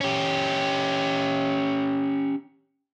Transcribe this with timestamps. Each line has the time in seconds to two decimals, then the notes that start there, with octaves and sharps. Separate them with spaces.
0.01 C#4 G4